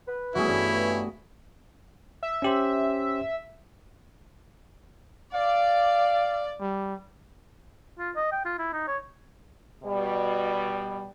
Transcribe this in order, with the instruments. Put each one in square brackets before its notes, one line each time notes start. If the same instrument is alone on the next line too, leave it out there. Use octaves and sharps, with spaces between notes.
[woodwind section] B4
[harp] G3 A3 B3 [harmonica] C#4 E4 [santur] F#4 G#4
[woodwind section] G2
[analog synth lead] E5
[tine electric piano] C#4 G4 C5
[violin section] D5 [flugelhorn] F5
[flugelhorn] G3
[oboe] F4
D#5
G5
F4
E4
D#4
C#5
[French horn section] B2 G3